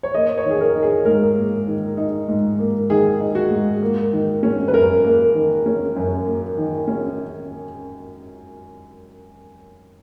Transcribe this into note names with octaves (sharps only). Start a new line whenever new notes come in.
C#5
A#3 D#5
C#5
D#3
G#4
A#4
D#4
G#4
G#2 A#4
A#3
D#3
D#4
G#2
A#3
D#3 G#4
D#4
F#4
G#2
A#3
D#3
C#4
B4
F#2 A#4
A#3
D#3
C#4
F#2
A#3
D#3
C#4